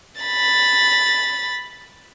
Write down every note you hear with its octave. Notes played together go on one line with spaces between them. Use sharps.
B5 A6